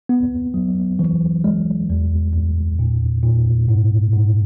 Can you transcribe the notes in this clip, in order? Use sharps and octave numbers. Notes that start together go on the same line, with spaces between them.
B3
F#3
E3
G#3
E2
E2
A#2
A#2
G#2
G#2